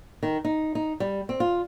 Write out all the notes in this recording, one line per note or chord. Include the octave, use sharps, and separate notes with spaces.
D#3
D#4
D#4
G3
C4
F4